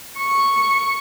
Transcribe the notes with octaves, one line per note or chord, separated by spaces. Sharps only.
C#6